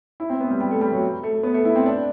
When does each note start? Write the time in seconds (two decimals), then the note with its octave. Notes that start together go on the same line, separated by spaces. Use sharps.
0.20 E4
0.30 C4
0.40 B3
0.50 G3
0.61 G3
0.71 A3
0.81 G3
0.92 F#3
1.23 A3
1.43 B3
1.54 A3
1.65 E4
1.76 C4
1.86 D4